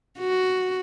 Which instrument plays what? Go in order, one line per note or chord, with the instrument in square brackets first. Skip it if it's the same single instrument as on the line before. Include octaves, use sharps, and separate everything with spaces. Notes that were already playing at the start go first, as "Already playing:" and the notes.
[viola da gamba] F#4